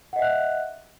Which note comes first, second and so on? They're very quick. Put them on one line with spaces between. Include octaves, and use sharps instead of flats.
F#5 D#5 E5 F#6